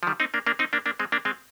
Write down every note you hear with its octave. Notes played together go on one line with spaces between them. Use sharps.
F3
D#3 G3
C4 D#4
A#3 D4
A#3 D4
C4 D#4
A#3 D4
A#3 D4
G#3 C4
A#3 D4
G#3 C4